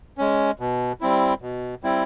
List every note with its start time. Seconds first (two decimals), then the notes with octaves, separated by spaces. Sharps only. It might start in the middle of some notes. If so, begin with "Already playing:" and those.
0.18 G#3 C#4
0.59 B2
1.01 G3 C4 E4
1.42 B2
1.83 G3 C4 E4